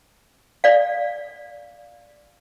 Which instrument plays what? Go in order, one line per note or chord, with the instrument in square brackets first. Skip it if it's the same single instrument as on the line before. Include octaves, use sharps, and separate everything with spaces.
[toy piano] D5 F5